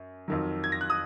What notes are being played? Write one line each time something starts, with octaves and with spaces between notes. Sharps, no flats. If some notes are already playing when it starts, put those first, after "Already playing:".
Already playing: F#2
F2 D#3 F#3
G#6
A#6
F#6
D#6